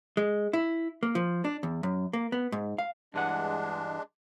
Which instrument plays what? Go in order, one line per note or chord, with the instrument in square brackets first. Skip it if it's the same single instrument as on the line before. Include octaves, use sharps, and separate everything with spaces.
[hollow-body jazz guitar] G#3
E4
A#3
F3
D4
E2
F#2
A#3
B3
G#2
F5
[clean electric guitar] G2 E3 F#5 [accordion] G#3 D4